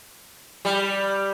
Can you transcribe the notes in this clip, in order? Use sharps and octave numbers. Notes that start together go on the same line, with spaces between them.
G3